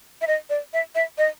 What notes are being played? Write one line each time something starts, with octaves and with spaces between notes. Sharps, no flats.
E5
D#5
D5
E5
E5
D#5